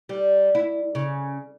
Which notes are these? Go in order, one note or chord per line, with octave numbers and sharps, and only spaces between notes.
G3
E4
C#3